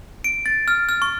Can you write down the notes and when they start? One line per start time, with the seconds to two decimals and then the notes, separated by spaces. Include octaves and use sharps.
0.24 D7
0.46 A6
0.68 F6
0.89 F6
1.02 C#6